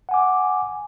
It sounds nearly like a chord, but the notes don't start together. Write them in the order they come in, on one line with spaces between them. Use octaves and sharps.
F#5 G#5 D6